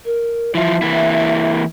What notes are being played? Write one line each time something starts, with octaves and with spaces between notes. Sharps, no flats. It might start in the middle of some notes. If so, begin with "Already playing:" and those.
A#4
E3 F3 E5
E3 A#3 E4